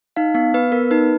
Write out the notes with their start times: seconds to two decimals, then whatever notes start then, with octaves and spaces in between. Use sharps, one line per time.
0.16 D#4 F5
0.35 B3 F5
0.54 B3 B4
0.72 B3 A#4
0.91 D#4 B4